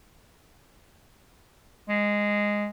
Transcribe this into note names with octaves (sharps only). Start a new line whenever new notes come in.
G#3